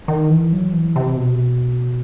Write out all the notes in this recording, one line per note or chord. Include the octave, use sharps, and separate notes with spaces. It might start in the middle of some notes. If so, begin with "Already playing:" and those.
D#3
E3
F#3
E3
C3
B2